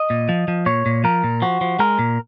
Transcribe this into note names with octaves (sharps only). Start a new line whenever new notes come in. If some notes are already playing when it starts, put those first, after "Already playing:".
Already playing: D#5
A#2
F3
F3
A#2 C#5
A#2
F3 A#4
A#2
F3 F#4
F3
G#3 A#4
A#2